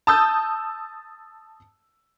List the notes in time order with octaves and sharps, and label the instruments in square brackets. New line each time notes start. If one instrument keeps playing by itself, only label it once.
[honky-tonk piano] A5 D#6 E6 G6